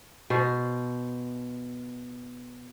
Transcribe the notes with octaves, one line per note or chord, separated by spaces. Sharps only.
B2 C5